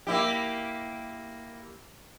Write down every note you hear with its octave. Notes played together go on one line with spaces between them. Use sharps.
A#3 E4 G4